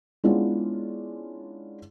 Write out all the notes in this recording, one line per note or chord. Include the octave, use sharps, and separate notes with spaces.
G#3 B3 C#4 D4 E4 F4